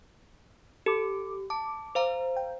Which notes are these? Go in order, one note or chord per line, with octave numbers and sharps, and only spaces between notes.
G4 A4 D6
A5 D6
C5 F5 A#5
G5